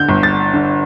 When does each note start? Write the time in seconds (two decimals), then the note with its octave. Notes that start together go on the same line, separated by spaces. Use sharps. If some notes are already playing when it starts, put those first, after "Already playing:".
Already playing: D3 G6
0.09 G1
0.23 A6
0.54 D3